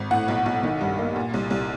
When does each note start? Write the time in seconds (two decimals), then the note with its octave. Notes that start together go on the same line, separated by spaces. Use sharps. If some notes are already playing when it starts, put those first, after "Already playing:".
Already playing: G#1
0.11 A2 F#5
0.28 B1
0.46 B1
0.63 D#3
0.81 G2
0.98 A#3
1.16 A#2
1.34 C2
1.50 C2